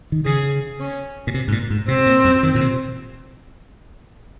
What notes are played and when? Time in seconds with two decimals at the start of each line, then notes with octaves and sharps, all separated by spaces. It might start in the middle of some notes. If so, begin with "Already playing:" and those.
0.12 D#3
0.25 C#3 G#4
0.80 C#4
1.27 A#2
1.34 C3
1.48 G#2
1.52 A#2
1.70 G#2
1.88 C3 C4
2.06 A#2
2.25 F#2
2.43 D#3
2.55 A#2
2.61 C3